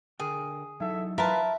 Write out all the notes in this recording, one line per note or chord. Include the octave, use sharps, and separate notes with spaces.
D3 G#4 A#4 G5
F#3 D#4 E4 A4 E5
F4 A#4 B4 E5 A5